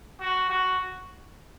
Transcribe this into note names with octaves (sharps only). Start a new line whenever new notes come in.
F#4
F#4